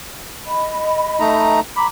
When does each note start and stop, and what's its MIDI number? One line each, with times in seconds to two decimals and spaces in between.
0.46 1.44 75
0.46 1.44 83
1.20 1.60 57
1.20 1.60 63
1.20 1.60 82
1.76 1.86 82
1.76 1.87 83
1.76 1.86 86